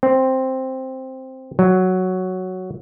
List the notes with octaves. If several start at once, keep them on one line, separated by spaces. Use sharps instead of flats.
C4
F#3